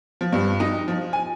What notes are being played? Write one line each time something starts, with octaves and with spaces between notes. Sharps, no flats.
F3
G2
D#4
F3
G#5